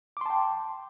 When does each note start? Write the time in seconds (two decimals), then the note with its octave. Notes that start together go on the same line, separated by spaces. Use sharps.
0.17 D6
0.21 C6
0.26 A5
0.30 G5